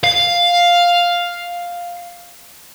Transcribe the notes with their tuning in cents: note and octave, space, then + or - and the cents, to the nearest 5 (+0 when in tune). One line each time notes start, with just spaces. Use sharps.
F5 +5